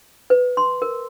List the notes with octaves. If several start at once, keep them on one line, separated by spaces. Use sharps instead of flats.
B4
C6
A#4